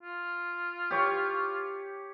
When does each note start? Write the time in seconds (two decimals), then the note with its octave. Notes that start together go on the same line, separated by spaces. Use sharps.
0.03 F4
0.91 G4 C#5